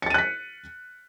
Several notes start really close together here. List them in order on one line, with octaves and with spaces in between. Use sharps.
C#7 A6 D#7 F#6 B6